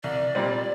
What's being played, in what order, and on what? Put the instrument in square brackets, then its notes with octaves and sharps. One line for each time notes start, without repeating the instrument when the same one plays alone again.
[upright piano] C2 [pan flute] D5
[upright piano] A#2 G3 C4